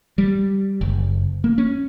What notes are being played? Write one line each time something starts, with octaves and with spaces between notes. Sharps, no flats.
G3
F#1
A#3
C#4